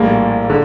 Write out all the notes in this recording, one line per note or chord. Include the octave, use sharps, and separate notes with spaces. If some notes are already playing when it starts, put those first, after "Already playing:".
Already playing: A#1 A2 G3 A#3
D3